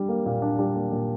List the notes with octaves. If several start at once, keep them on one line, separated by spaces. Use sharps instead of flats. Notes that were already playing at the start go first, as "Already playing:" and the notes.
Already playing: G3 D4
A#3
A#2
D4
G3
A#3
A#2